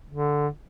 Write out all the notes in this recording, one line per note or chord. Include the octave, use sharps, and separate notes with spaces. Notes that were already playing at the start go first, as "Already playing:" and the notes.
D3